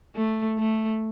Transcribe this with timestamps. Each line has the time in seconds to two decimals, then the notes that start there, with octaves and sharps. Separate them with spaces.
0.16 A3
0.59 A3